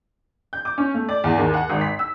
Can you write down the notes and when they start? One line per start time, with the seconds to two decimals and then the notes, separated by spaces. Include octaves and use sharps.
0.53 G6
0.65 D6
0.78 C#4
0.94 A3
1.09 D5
1.24 E2
1.38 D#2
1.54 F#5
1.70 G#1
1.81 B6
1.99 E6